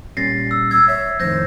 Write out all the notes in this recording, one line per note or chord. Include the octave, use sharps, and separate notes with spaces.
A#2 G3 C#4 A6 A#6 C7
E6
E6 G#6
C#5 E5
F2 A2 D#3 C5 G6 A#6